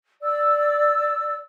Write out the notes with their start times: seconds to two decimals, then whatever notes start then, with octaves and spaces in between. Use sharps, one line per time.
0.22 D5 E6